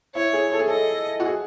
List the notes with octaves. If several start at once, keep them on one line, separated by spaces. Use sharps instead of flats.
E4 C#5
G#4
A4
G#4
A4 D#5
F#4
G#4